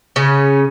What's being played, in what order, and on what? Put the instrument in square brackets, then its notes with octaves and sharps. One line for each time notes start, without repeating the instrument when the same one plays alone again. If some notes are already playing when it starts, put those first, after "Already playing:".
[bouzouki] C#3 C#4